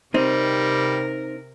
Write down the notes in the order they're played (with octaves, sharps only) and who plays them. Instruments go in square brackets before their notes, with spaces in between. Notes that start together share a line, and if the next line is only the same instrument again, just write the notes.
[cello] C3 A#4 [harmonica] G3 [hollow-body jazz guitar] C4 D#4